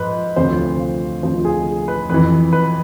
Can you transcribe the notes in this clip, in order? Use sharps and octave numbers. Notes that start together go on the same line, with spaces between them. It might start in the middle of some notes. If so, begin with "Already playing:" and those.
Already playing: G#2 F3 B4
D2 C3 F3 C5
F4
D2 C3 F3 F4
G#4
B4
F2 E3 B4
B4